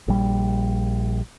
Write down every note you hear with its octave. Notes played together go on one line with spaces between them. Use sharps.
A#1 G3